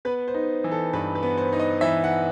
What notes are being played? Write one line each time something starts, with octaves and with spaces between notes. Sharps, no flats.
B3 B4
C5
D#4
E3
A4
G2 B4
B4
B3
C5
D#4
D#5
E3 E5
F#5